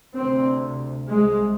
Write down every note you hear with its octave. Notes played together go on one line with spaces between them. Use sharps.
D2 C3 C4
C2 C3 G#3